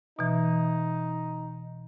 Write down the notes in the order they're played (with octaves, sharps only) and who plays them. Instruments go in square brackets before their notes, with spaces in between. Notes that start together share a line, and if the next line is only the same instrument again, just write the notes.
[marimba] B2 E3 [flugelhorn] D#4